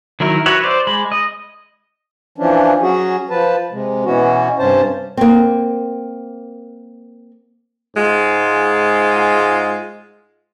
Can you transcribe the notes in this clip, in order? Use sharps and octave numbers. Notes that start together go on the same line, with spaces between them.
D#3 F#3 E4 A#4
F#4 B4 C#5 E5 F#5
C5 D5
G#3 B5
D#5
E3 F3 C#4 D4
F#3 C#4 F#4 G#4
F3 B4 A5
C3 G#3
B2 E3 B3 C#4 F#4
G2 C3 C#4 C5 A5
A#3 C4
G#2 G#3 F4